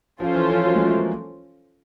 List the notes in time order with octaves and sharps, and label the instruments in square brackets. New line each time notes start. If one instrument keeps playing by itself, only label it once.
[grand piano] F3 [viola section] C#4 F4 A4 C5
[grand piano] E3
F3
F#3
G#3
A3
A#3